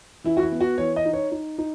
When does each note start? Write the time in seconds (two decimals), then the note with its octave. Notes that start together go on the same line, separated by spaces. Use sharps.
0.24 E3 E4
0.37 F#4
0.43 E4
0.52 B3
0.61 F#4
0.78 E3 C#5
0.96 D#5
1.05 D#4
1.14 C#5
1.32 D#4
1.58 D#4